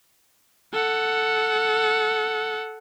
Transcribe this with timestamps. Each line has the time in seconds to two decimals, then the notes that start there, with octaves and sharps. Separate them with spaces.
0.73 A4 F#5